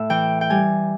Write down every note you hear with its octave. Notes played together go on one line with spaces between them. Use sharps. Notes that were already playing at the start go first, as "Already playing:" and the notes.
Already playing: A2 E5
E3 G5
G5
G3 G#5